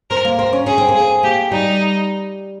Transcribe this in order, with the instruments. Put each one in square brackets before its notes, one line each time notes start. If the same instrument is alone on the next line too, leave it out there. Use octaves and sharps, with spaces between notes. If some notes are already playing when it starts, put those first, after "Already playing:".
[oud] C4 [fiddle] A#4
[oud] A#3
[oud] C4 [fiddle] A#4
[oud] C#4
[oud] C#4 [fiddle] G#4
[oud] C4
A#3
[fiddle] G#4
[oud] C4
[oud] A#3 [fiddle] G4
[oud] G3 [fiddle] D#4